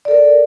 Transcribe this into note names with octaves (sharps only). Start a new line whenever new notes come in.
A4 A#4 D5